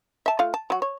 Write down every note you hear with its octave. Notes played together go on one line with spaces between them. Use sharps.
E5 A5
A3 F4 F5
A5
F#3 F#4
C#5